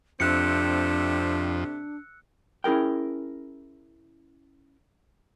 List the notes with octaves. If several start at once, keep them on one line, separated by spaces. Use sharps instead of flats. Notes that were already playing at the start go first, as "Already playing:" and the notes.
F2 C3 A3 C4 D4 E6 F#6 C#7
C#4 E4 G#4 A#4 G5